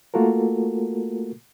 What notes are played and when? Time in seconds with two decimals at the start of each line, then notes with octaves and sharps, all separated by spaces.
0.14 A3 A#3 F4 F#4 A4 A#4